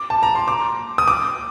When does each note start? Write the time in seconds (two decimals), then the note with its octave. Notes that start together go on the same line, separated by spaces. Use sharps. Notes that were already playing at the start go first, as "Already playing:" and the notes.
Already playing: D6
0.10 A5
0.23 A#5
0.35 C6
0.48 D6
0.98 D#6
1.08 D6